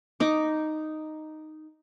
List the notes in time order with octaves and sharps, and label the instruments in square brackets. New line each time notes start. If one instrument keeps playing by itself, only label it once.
[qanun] D#4 D6